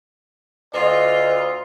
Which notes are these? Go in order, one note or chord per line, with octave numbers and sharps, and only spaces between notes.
D2 F4 D#5